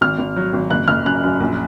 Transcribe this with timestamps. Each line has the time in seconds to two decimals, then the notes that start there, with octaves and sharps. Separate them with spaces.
0.01 G#1 F6
0.18 G#1
0.36 F#3
0.53 G#1
0.70 F#1 F#6
0.88 F#1 F6
1.05 F#2 F#6
1.23 F#2
1.40 A#1